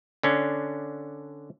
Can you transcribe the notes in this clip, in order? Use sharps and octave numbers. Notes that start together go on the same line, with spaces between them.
D3 C#4 D4